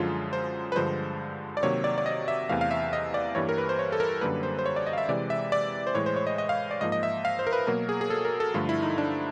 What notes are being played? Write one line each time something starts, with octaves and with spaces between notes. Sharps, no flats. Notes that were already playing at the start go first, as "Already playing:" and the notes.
Already playing: F#2 D3 F3 G#3 F4
C5
B4
G2 D3 F3 G#3 C5
D5
C3 D#3 F#3 A#3 C#5
D5
D5
D#5
E5
E2 C3 E3 A3 F5
F5
E5
D#5
D5
G2 E3 G3 A#3 C#5
A#4
B4
C5
C#5
A4
A#4
F#2 D3 G3 A#3 B4
C5
C5
C#5
D5
D#5
F5
E5
C3 E3 G#3 D5
E5
D5
C5
A2 E3 G#3 C#5
C5
C#5
D#5
D#5
F5
D5
G#2 F3 A#3 D#5
D#5
E5
F5
C5
A#4
B4
B2 F#3 A#3 A#4
G#4
G#4
A4
A#4
A4
G2 D3 F3 A3 F4
E4
D#4
D4